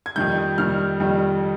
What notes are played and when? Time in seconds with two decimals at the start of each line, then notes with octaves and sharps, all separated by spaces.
0.06 G#6
0.16 F2 D#3 G3 G6
0.58 F2 D#3 G3 F6
1.00 F2 D#3 G3